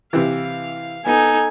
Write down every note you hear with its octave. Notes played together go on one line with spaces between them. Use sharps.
C3 E3 F5
B3 D#4 A4 G#5